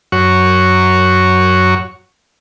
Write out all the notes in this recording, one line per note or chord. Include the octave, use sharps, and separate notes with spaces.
F#2 F#4 C#5 C#6